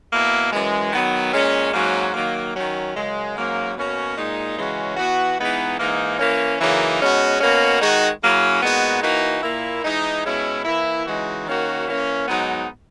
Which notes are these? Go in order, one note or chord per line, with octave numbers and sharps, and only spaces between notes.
B2 A#3 E4
F#2 E3 G#3
D#3 F#3 B3
A#2 G#3 C#4
G#2 F#3 A#3 C#4 F#4
D#3 F#3 A#3
D#3 F#3 C#4
F#2 C#3 G#3
G#2 F#3 A#3 C#4
B2 A#3 C#4 F#4
A#2 G#3 D#4
C#3 E3 G#3 C#4 F#4
E3 B3 F#4
E3 G#3 B3 D#4
G#2 E3 A#3 D#4
E3 A#3 C#4
F#2 C#3 E3 A#3 D#4
B2 G#3 C#4 F#4
B2 A#3 C#4 F#4
D#3 G#3 D#4 F#4
C#3 F#3 A#3 C#4 E4
A#2 G#3 B3 D#4 F#4
E3 A#3 D#4 F#4
A#2 A#3 E4
E3 G#3 D#4
B2 G#3 C#4 E4
E3 A#3 E4
C#3 E3 G#3 D#4 F#4
D#3 A#3 C#4 F#4
E3 A#3 C#4
G#2 F#3 B3 D#4